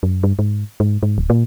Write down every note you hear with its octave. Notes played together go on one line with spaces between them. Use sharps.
F#2
G2
G#2
G#2
G#2
D1
A#2